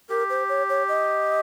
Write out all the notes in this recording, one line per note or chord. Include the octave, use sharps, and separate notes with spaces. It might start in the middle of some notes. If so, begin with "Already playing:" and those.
G4 A#4
C5
C#5
C#5
D#5